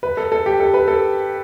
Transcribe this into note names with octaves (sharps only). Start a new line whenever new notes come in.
B4
A4
A4
G4
A4
B4
A4